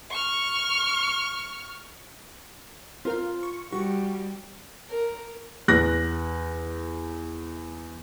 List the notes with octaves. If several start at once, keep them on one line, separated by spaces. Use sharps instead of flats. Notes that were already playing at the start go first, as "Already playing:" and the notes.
C#6 F6
C4 F4 A#4 F5
C#6
G3 F#4 C#6
A#4
E2 F#6 A#6